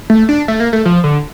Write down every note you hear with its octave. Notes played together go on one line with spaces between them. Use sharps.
A3
D4
A3
A#3
A3
F3
D3